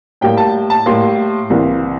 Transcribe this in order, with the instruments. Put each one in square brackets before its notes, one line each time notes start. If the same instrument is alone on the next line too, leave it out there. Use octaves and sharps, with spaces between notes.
[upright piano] A2 G3 A#3 G5
A5
A5
A2 G3 A#3 C6
C2 C3 E3 A#3